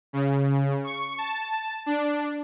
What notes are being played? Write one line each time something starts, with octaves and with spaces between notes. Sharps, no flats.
C#3
C#6
A5
D4